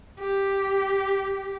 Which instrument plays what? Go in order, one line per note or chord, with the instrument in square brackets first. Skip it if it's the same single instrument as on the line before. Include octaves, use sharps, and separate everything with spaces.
[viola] G4